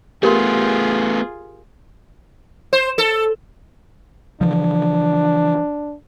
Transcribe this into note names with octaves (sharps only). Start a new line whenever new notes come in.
A3 B3 F4 G4 G#4 A#4 C6
C5
A4
C#3 E3 F3 D4